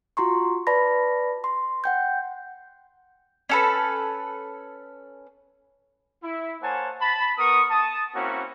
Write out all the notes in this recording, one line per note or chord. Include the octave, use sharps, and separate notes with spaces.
F4 F#4 A#5 C6 C#6
B4 D5 A5 B5 A#6
C6
F#5 G5 G6
C#4 A4 B4
E4
A#3 C5 C#5 F#5 G#5 A5
A5 B5
B3 A#4 C#6 D#6
A5 D#6
A#3 C4 C#4 E4 F#4